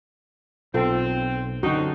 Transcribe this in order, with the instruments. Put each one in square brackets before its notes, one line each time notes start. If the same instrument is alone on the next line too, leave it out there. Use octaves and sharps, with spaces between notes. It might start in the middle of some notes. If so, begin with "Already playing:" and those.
[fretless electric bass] B1 [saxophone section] C4 [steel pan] F4 A4
[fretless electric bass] F#2 D3 [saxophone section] C4 D#4 [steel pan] F#4